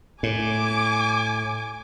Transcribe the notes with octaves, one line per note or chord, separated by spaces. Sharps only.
A2 G#5 D6